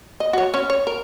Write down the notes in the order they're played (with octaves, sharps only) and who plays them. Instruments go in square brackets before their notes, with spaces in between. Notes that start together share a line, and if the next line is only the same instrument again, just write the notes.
[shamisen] D#5
F#4 C#5
C#4 C#5
C#5
A#4